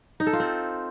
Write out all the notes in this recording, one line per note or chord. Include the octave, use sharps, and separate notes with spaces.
D#4
A4
F4
C4